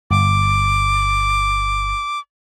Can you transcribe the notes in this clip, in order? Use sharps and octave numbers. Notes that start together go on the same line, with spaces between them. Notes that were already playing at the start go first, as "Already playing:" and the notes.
G1 D6